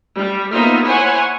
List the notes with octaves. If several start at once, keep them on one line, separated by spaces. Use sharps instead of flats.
G3
A#3 B3 D#4 F4 C5 E5
E4 C5 C#5 F#5 G#5